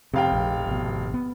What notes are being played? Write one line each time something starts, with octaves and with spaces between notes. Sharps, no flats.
F1 C3 F5 G5
A#1
G#1 B2
B3